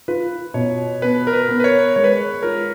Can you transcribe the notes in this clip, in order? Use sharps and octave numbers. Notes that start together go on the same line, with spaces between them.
F4 B4
B2 C#5
B3 B4
A#4
B4
B3
B4
C#5
G#3 C#5
B4
C#5
F4 A#4